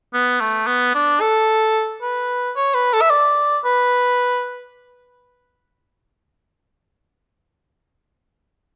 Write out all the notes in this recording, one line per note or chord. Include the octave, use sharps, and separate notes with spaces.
B3
A3
B3
D4
A4
B4
C#5
B4
A4
E5
D5
B4